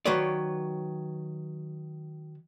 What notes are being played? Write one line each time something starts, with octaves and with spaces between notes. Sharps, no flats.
D#3 F#3 B4 C#5 D5